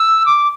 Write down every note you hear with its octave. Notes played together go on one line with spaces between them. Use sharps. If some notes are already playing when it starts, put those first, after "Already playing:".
Already playing: E6
D6